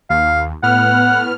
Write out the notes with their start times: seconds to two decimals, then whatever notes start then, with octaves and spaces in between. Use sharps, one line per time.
0.10 D#2 F5
0.63 A2 B3 F#5 F6